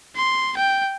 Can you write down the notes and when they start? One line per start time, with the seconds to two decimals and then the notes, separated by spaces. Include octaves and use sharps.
0.16 C6
0.57 G5